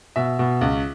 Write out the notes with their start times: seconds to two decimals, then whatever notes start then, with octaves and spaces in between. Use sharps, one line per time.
0.16 B2 E5
0.39 B2
0.61 C#2